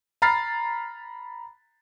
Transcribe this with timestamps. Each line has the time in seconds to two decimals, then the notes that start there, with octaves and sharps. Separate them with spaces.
0.22 A#5 B5 F6 A6 C7